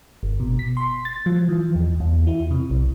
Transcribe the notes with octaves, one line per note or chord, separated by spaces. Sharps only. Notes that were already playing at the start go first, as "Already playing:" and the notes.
G1
B2
B6
C6
A6
F3
E3
E2
E2
E4
C3
B1